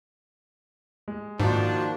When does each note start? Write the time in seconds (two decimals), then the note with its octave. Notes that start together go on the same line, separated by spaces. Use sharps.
1.08 G#3
1.40 G#2 D#3 F3 A#3 D4 D#4 F#4